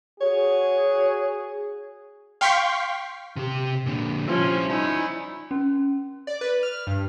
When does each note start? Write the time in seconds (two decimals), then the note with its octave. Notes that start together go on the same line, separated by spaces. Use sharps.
0.21 F#4 G#4 C#5
2.41 F5 G5 C6 C#6 B6
3.36 C3 G4
3.86 A#2 D3
4.28 F3 G3 C#4 E4
4.70 D#4 E4 D5 G#5
5.51 C#4
6.27 D5
6.41 B4
6.63 F6
6.87 G2